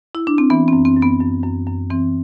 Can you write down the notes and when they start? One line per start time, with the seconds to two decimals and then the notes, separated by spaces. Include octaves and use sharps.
0.15 E4
0.27 D4
0.38 C4
0.50 E3 B3
0.68 C4
0.73 F#2
0.85 C4
0.97 F#2
1.02 B3
1.20 F#2
1.43 F#2
1.67 F#2
1.90 E3 C4